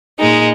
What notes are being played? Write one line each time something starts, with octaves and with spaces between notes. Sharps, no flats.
A#2 G#3 D#4